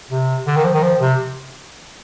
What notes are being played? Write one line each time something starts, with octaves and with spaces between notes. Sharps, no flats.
C3
D3
D#3
F3
D#3
F3
C3